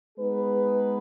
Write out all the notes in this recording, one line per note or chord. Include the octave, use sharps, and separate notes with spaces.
G#3 B3 D#4 G#4 B4